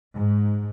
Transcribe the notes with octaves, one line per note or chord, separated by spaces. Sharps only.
G#2